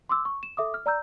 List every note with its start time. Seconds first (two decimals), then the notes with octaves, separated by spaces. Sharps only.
0.09 C6 D6 E6
0.25 C#6
0.43 E7
0.57 A4 E5 D6 D#6
0.74 F6
0.86 D5 A#5 E6 G6